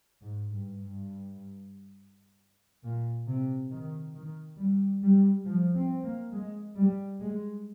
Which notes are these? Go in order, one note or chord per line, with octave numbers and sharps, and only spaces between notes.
G#2
G2
G2
A#2
C3
D#3
D#3
G3
G3
F3
C4
A#3
G#3
G3
G#3